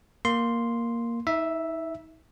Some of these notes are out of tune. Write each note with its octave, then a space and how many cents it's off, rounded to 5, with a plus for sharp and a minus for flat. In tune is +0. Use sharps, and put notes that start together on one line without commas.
A#3 +0 C6 +0
D#4 +40 E5 +0